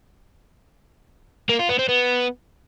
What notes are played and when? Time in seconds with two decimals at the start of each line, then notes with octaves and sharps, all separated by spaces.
1.49 A#3
1.59 F4
1.69 B3
1.79 C4
1.89 B3